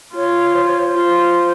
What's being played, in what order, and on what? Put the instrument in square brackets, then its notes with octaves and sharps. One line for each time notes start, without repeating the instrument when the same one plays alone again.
[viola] F4 [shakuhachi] C#5
[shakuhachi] C5
C#5
C5
[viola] F4